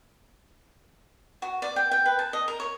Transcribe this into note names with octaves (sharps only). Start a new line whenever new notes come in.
F#4
D5
G5
G5
B4
A5
D#5
A#4
C#5